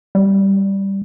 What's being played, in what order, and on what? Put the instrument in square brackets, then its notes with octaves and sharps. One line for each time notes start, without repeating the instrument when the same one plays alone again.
[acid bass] G3